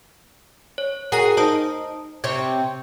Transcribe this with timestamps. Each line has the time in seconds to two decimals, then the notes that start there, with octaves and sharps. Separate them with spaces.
0.78 C#5
1.12 F#4 G#4 A#4 A#5 C7
1.37 D#4 C5 A5 D#6
2.24 C3 C4 C#5 G#6